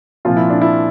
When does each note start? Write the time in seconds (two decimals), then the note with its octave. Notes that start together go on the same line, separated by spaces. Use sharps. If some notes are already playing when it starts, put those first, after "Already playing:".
0.25 C2 A#2 F3 F4
0.37 E4
0.50 D4
0.61 E4